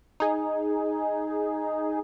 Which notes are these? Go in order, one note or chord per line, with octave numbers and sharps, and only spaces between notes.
D#4 G#4